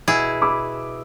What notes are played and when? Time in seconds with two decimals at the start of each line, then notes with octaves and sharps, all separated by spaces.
0.08 B2 E4 G#4
0.41 B5 D6 E6